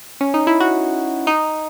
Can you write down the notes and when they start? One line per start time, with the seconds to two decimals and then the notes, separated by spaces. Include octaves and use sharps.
0.21 C#4
0.34 D#4
0.47 E4
0.60 F#4
1.27 D#4